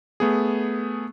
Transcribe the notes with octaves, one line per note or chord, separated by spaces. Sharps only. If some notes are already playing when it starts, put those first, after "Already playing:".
A3 B3 G#4